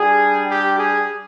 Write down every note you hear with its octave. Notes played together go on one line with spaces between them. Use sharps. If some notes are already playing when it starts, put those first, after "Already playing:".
Already playing: G3 D4 G4 G#4
G4
G#4